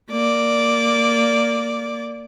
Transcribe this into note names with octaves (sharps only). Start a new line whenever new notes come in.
A#3 D5